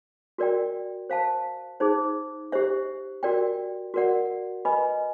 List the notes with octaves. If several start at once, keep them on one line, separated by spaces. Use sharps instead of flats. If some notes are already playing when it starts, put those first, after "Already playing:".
F#4 A#4 D5 G5
C5 F5 A5
D#4 G#4 C5
G4 C5 E5
F#4 A#4 D5 G5
F#4 A#4 D5 F#5
B4 D#5 G#5 B5